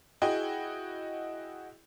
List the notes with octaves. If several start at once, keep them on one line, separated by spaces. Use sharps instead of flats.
E4 F#4 G#4 D#5 G5